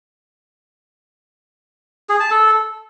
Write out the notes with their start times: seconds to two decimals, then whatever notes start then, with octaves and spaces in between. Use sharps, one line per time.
2.09 G#4
2.20 A5
2.31 A4